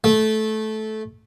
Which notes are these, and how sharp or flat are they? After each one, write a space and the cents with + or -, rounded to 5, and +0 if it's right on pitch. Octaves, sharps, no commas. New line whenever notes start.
A3 -15